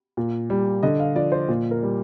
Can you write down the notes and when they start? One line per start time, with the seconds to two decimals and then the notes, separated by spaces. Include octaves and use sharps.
0.17 A#2
0.50 G3
0.83 D3 D#5
1.00 F5
1.16 F3 D5
1.32 C5
1.48 A#2
1.71 A#4
1.83 G3